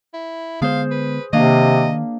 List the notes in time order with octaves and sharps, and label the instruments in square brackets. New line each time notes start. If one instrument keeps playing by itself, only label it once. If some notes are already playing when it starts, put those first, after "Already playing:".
[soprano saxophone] E4
[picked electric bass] D3 G#3 B3 [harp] G#4 C5 [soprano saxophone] F5
[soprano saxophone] B4
[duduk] C3 [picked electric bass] D#3 [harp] A#3 D4 F5 [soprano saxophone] D#5